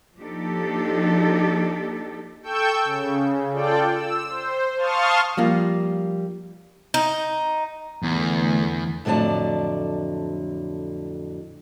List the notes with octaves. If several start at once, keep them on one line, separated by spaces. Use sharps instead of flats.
F3 A#3 D4 D#4 G4 A4
A4 G5 C#6 E6 G6
C#3
F4 A4 D5 G5
E6
C5
F5 A5 C6 C#6 D#6 F6
F3 G3 A#3 F4
D#4
E2 D3 A3
F2 A2 D3 F#3 D5 A5